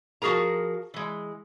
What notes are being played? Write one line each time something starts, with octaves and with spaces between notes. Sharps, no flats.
F3 F#4 G#4 A#4 A#5
E3 G#3